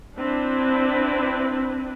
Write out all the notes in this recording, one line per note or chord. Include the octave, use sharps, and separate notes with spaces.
C4 D4 E4 B4